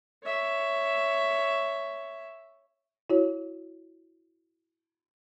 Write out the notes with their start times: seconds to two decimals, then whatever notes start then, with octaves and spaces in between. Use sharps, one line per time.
0.24 C#5 E5
3.10 E4 F#4 C#5